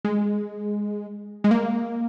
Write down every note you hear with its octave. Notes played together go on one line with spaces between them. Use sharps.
G#3
G#3
A#3